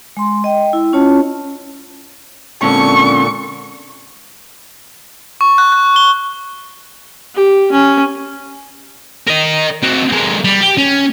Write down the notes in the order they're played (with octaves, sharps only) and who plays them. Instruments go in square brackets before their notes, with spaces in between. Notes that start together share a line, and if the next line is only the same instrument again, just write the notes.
[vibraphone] G#3 C6
D#5 G5
E4
C#4 F4 C#5 A5
[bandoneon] A#2 D3 [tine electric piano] G#3 C4 [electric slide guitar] C#4 A4 [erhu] C#6
[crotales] C#6
F#6
F#6
G7
[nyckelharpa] G4
C#4
[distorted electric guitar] A#4 D#5
C4 F#4
G#3 A#3
G3
G4
C#4